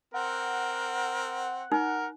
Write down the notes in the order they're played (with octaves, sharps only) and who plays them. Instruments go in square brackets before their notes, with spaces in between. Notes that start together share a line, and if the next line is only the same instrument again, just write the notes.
[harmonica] C4 [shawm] A#4 [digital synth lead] F#5
[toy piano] D#4 [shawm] A#4